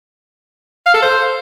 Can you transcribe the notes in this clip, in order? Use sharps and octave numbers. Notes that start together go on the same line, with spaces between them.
F5
A4
C5